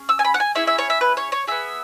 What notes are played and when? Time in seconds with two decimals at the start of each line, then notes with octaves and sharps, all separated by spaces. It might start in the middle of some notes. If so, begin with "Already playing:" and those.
Already playing: C#4 G#4
0.09 E6
0.19 G#5
0.25 B5
0.34 F#5
0.40 G#5
0.55 C#4 E4 G#4 E5
0.67 E5
0.78 C#5
0.90 E5
1.01 B4
1.17 C#5
1.32 C#5
1.47 B3 G#4 E5